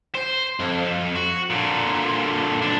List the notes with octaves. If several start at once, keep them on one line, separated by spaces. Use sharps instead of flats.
C5
F2
F#4
A#2 D3
B1 D4